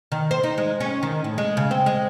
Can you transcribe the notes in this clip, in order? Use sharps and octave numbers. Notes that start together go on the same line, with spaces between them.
D#3
C5
D#4
G#3
C#4
D#3
A2
G#3
C#3
C4
G#3